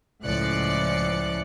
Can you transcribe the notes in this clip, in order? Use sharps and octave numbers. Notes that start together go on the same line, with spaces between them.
C#2 A2 F3 D5 F#6 C#7